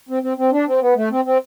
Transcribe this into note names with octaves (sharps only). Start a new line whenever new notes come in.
C4
C4
C4
D4
C4
B3
A3
C4
C4